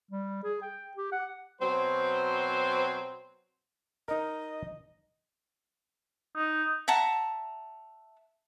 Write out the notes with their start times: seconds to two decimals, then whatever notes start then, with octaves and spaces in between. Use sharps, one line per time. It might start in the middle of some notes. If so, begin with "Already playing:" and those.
0.11 G3
0.43 G#4
0.62 G5
0.97 G4
1.12 F#5
1.61 B2 F#3 C4 C5
4.08 D#4 A#4 D#5
6.36 D#4
6.88 E5 F#5 A5 A#5